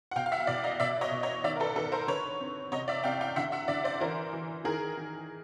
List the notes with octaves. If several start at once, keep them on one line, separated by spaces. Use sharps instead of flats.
F#5
B2 F5 G5
F5
E5 F#5
F5
B2 D5 E5
D#5 F5
B2 D5 E5
C#5 D#5
B2
C#5 D#5
D#3 D5 E5
A#4
A4 B4
D#3 A4 B4
A#4 C5
D3 B4 C#5
C4
C3 C#5 D#5
D5 E5
C3 F5 G5
F5 G5
D3 E5 F#5
E5 F#5
D3 D5 E5
C5 D5
E3 A#4 C5
E3
D#3 G#4 A#4
D#3